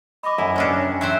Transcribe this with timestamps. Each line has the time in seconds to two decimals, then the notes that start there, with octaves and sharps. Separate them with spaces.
0.23 D#5 B5 D6
0.38 F#2 E4 G#5 B5
0.56 C3 C#4 D4 C5
0.79 C#5
1.01 F#3 C4 C5 E5